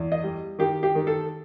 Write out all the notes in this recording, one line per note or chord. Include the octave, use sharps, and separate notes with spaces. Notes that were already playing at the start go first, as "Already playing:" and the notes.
Already playing: E2
D#5
G3
D#3 G4
G4
D#3
A4